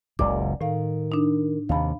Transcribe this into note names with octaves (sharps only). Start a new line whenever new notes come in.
F#1 C#2 A#2 D5 D6
A2 D#3 F5
D4 D#4
D#2 C3 F5 B5